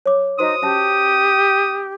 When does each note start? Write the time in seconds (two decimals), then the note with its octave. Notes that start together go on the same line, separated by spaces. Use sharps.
0.06 C#5 D6
0.39 D#4 F#4 C5 C6 D#6
0.62 C#4 G4 E5 A5